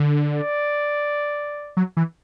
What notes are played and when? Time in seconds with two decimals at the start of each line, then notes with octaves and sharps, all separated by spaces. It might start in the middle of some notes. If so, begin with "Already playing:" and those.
Already playing: D3
0.33 D5
1.77 F#3
1.97 E3